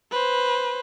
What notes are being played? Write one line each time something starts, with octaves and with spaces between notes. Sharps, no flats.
B4 C5